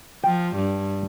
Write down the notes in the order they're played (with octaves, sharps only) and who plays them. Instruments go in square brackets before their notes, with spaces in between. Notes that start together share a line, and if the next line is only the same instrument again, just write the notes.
[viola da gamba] F3 [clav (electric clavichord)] G5
[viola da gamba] G2